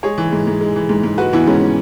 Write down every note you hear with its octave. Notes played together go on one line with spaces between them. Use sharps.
G#3 G#4 C#5
E3
G#2
G#2
G#3
E3
G#2
G#2
G#3 F#4 B4
E3 B3 E4
G#2 C#4
C#4